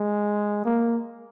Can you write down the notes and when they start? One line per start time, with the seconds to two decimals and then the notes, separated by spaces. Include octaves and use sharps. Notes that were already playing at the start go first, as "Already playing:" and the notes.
Already playing: G#3
0.65 A#3